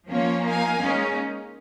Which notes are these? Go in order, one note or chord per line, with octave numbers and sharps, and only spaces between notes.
F3 A#3 C#4 F4 C#5
D#4 A#4 F5 G#5
G#3 A#3 C#4 D#4